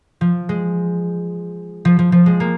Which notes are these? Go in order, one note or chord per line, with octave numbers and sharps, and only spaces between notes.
F3
G#3
F3
F3
F3
G#3
A#3